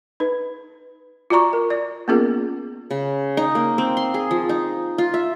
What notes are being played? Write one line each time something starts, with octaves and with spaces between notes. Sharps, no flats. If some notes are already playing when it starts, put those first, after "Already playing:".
D#4 B4
F4 F#4 D5 A#5 C#6
A#4
D5
A#3 B3 C#4 F4 G#4 A#4
C#3
D#4
A#3
C4
C6
G#4
F3
D#4
F4
E5